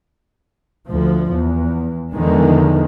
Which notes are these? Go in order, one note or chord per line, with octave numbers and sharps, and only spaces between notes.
D2 F3
E2
E2 D3 D#3 F3 G#3